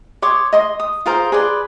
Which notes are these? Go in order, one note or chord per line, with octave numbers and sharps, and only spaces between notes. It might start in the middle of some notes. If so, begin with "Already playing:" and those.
C#5 C6 D6 D#6
D#5 C6 D#6
D#6
F4 G#4 A#4 C5
G#4 B4 D5 C6